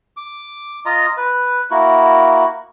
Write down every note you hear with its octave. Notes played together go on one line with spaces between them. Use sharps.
D6
F4 D#5 A#5
B4
A#3 E4 F#4